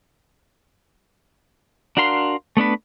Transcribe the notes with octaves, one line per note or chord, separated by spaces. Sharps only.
D4 F#4 A#4 F5 C6
A3 B3 D4 B4